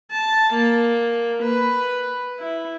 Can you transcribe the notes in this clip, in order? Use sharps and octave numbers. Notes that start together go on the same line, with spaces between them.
A5
A#3
B4
E4